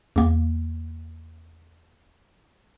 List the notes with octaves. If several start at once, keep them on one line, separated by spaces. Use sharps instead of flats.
E2 A#3